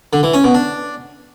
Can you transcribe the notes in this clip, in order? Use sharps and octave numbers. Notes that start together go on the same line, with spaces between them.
D3
E3
C#4
B2
D4